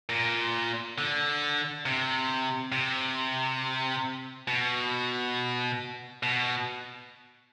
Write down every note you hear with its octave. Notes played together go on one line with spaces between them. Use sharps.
A#2
D3
C3
C3
B2
B2